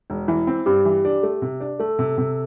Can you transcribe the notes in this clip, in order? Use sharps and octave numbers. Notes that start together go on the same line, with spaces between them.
E1
E3 E4
C4
G2 G4
E3
D4
A3
C3
D4
A3 A4
C3
C3